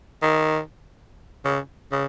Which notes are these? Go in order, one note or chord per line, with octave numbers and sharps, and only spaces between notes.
D#3
C#3
C#3